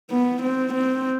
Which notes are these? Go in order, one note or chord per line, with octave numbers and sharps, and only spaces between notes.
B3
C4
C4